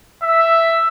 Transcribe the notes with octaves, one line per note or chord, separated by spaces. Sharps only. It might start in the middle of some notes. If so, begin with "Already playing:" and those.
E5